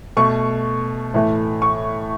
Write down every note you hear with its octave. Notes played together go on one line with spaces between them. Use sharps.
B2 A3 C#6
A2 E3 A3
C#6